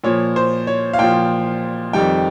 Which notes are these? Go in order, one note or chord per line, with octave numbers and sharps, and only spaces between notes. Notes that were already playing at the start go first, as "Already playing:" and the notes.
A#2 F3 C#5
C5
C#5
F5
A#2 F3 G5
F2 D#3 G3 G5